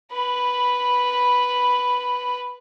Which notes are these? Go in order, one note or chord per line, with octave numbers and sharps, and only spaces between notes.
B4 B5